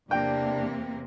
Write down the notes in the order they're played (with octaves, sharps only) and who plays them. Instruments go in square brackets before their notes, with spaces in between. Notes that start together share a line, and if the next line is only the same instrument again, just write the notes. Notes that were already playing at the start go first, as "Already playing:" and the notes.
[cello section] E2 C3 A#3 [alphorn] D4 [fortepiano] G5